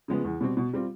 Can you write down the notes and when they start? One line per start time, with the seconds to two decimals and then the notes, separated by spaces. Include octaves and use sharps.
0.08 C#3 F3 G#3 B3
0.24 E2
0.41 B2 G3 C4
0.57 B2
0.73 G3 C4 F4